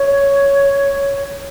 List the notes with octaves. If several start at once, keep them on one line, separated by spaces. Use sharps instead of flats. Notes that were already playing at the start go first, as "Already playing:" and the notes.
Already playing: C#5